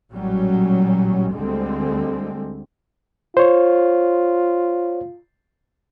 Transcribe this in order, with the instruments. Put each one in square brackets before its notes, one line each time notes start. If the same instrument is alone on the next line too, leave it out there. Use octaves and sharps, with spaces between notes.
[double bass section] A1 A#2 F#3 G3 C#4
D2 D3 G3 G#3 C4
[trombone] F4 [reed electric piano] C5 C#5